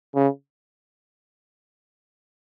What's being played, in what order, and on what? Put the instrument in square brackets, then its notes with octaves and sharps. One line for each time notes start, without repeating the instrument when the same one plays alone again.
[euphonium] C#3